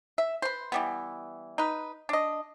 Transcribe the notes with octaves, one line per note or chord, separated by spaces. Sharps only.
E5
B4 C5
E3 G3 B3
D#4 B4
D4 D#5